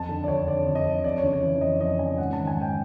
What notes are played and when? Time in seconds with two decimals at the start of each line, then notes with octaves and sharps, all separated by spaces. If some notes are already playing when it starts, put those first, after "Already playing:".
Already playing: F2 A5
0.09 D3
0.24 D5
0.28 F2 C#5
0.47 D3 D5
0.66 F2
0.75 D#5
0.86 D3
1.04 F2 D5
1.18 C#5
1.23 C#3
1.33 C#5
1.42 E3
1.61 F2 D#5
1.81 F2 D#5
1.99 C#3 G#5
2.18 G#2 F#5
2.33 D#3 A5
2.47 G#5
2.56 G#2
2.62 G5